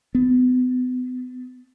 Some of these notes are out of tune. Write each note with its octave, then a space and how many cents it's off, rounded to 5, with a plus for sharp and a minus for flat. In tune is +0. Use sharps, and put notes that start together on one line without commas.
B3 +35